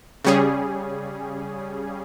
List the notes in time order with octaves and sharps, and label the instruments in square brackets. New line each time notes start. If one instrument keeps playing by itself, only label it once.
[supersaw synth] C#3 G3 C#4 G#4